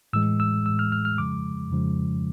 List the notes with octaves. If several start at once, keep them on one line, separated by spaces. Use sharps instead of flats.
A2 E3 G#3 E6
E6
A2 E3 G#3 E6
F6
F6
F6
F2 C#3 F3 G#3 D6
F2 C#3 F3 G#3